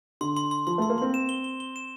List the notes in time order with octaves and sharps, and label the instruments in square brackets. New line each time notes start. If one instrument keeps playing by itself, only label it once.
[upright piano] D3 [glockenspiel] C6
[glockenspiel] C6
C6
[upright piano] F3 [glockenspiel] C6
[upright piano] A3 [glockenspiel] C6
[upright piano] A#3
[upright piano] C4 [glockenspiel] C6
[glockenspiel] E7
G7
G7
G7
E7